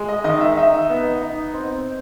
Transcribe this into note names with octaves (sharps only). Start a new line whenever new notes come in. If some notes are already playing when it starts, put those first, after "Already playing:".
Already playing: G#3
D#5
D#3 D#5
E5
D#4 E5
B3
D#4
C4